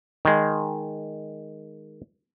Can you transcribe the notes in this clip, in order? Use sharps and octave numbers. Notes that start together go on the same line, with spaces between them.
D#3 G#3